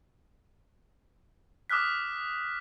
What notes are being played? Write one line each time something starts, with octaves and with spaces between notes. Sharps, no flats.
D6 D#6 F6 F#6 B6